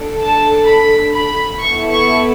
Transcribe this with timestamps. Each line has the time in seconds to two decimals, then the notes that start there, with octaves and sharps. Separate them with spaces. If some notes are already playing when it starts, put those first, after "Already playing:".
Already playing: D4 A4
0.20 A5
0.67 B5
1.13 B5
1.59 B3 E4 A4 C#6
1.91 C#6